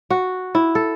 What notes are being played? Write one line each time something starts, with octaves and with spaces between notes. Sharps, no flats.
F#4
E4
A4